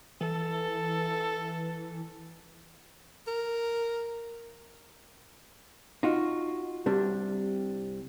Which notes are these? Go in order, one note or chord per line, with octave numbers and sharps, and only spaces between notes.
E3 A4
A#4
D#4 F4 F#4
C2 C3 G3 D4